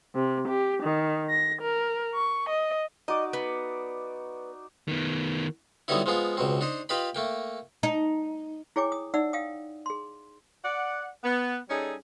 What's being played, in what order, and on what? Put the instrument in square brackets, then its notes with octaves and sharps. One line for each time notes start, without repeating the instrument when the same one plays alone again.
[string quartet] C3
G4
D#3
A#6
A#4
C#6
D#5
[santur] D#4 F#4 D5 [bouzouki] D#5
[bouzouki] B3
[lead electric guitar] D#3 B3
[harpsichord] D3 F#3 G3 B3 D#4 E4
F3 G#3 B3 F4
C#2 B2 C4
D4 D#4 C5
F4 G4 B4 D#5 G5 B5
A3 A#3 G5
[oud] D#4
[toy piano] E4 G#4 C#5 G5 G#5 D6
D#6
D#4 D5 E5 F#5 E6
F5 G5 D#6
G#4 C6
[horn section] D5 F#5
B3
G3 C#4 D#4 G#4 A4